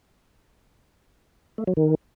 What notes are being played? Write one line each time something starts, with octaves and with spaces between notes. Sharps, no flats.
A3
F#3
D#3